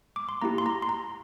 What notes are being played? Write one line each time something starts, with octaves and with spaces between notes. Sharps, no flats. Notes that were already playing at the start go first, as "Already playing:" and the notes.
D6
C6
A#3 E4 G4 A#5
C6
A#5
C6
A#5